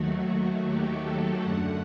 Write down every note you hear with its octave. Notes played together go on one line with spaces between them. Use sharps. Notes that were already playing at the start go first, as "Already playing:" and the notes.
Already playing: D#2 D#3 F#3 A3 F#4
G4
A4
F#2 D3 A3 F#5